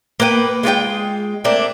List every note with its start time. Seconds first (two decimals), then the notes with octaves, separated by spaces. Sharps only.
0.20 A#3 B3 B4 G5
0.63 G#3 F4 F#4 G5
1.44 A3 A#3 C4 D4